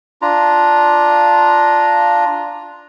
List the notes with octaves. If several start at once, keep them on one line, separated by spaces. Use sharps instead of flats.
D4 F4 A#5